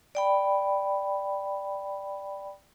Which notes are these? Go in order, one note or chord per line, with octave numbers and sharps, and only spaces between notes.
D5 G5 B5